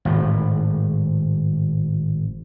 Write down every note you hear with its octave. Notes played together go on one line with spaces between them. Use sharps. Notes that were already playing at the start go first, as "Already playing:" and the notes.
G#1 A2